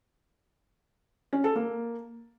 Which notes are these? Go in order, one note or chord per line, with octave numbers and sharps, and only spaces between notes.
C#4
A4
A#3